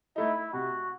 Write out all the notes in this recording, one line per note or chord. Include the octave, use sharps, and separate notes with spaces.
A3 D#4 E4
C3 F#4